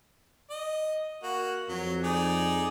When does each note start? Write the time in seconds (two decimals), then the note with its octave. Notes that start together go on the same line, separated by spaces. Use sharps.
0.50 D#5
1.23 A#3 F#4
1.69 F2 F#3
2.03 D#4 G#4 D5